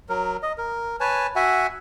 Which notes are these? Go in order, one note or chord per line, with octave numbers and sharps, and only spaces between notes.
F#3 A#4
D#5
A#4
B4 C#5 G#5 A5
F#4 E5 F#5 G#5